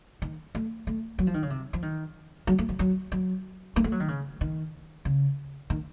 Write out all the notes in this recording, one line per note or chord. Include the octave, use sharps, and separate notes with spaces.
D#3
A3
A3
F#3
F3
D#3
C#3
C3
F3
D#3
F#3
A3
F3
F#3
F#3
A#3
A3
F#3
D#3
C#3
D#3
C#3
D#3